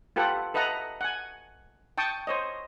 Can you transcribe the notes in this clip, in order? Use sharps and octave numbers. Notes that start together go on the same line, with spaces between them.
F4 G4 A4 B4 F#5
A4 B4 D#5 E5 F#5 A#5
F#5 G#5
G5 A5 C#6 D#6
C5 C#5 D#5